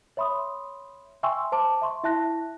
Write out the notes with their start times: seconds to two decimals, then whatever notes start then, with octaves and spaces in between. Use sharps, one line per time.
0.17 C#5 E5 B5 C6 D#6
1.23 E5 G5 G#5 C6 C#6 E6
1.52 C5 A5 D6
1.82 E5 C6 C#6
2.04 E4 E5 A5 F#6 A#6